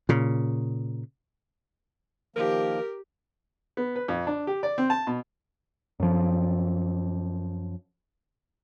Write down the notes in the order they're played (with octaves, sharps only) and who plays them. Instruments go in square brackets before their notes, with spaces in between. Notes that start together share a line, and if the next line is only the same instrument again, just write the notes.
[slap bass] A#2 C#3
[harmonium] D#3 F3 A#3 [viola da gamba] G4 [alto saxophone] A#4
[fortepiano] B3
B4
F2
D4
G4
D5
C4
A5
B2
[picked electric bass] F#2 F3